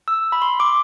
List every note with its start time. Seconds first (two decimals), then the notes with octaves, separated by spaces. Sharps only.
0.08 E6
0.32 B5
0.42 C6
0.60 D6